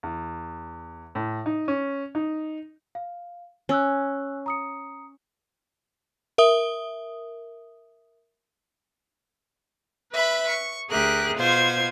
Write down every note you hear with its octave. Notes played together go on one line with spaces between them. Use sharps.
E2
A2
D#4
C#4
D#4
F5
C#4 G#5 E6 F#6
A#5 D#6 C#7
A#4 E5 D#6 G7
B4 E5 B5
C#6
D2 G4 G#4 A#4 E5 F#6
B2 F4 C5 C6 G#6